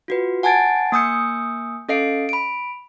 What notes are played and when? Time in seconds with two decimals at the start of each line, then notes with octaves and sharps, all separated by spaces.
0.08 F4 F#4 B4
0.43 F#5 G#5 A5 G#6 A6 D7
0.92 A#3 G#5 D#6 E6 G6 C#7
1.89 C#4 A4 D#5 F5 C7 D7
2.29 B5 D7